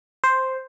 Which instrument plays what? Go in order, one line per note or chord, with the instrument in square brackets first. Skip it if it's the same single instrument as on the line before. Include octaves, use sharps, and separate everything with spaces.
[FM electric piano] C5